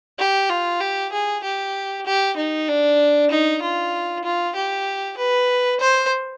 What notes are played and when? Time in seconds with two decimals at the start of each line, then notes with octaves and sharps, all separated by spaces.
0.18 G4
0.49 F4
0.80 G4
1.12 G#4
1.44 G4
2.06 G4
2.37 D#4
2.68 D4
3.31 D#4
3.62 F4
4.24 F4
4.56 G4
5.18 B4
5.80 C5